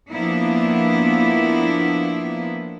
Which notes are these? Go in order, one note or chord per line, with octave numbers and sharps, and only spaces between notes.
F3 A#3 B3 D4 E4